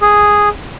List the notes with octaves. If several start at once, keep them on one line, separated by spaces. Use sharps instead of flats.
G#4